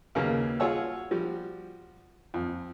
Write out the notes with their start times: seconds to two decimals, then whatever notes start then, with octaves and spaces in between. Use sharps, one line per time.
0.15 D#2 C#3 F#3 A#3 B3
0.60 F4 F#4 G#4 C#5 F#5 E6
1.11 F3 G3 F#4
2.34 F2